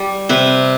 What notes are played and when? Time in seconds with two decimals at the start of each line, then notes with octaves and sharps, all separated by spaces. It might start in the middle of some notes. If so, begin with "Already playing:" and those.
Already playing: G3
0.29 C3 B4